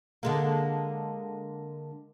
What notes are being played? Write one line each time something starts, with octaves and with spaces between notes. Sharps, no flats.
D3 G#3 A#3